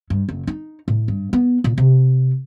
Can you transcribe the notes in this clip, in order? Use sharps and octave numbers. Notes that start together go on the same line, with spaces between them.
G2
F#1
D#4
A2
G2
B3
A#2
C3